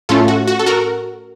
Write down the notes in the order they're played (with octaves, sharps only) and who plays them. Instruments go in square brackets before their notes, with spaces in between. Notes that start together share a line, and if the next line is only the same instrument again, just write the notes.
[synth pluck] A2 A3 C#4 F4 A4
F#4
F#4
A4
F#4 A#4